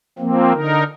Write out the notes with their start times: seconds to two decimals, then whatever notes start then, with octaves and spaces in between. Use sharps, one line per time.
0.19 F3 A#3 C4
0.53 D3 D#4 A#4